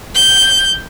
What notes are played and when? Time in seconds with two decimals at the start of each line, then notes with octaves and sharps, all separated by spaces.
0.15 G6